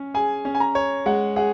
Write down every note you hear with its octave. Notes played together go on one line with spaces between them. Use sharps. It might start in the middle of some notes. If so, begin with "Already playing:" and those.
Already playing: C#4 C#5
G#4 G#5
C#4
G#5
A#5
C#5
G#3 F#5
G#4 F#5